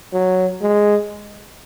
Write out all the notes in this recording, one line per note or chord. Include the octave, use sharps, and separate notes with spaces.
F#3
G#3